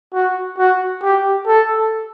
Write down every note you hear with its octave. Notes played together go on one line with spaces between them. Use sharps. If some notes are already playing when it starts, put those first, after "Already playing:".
F#4
F#4
G4
A4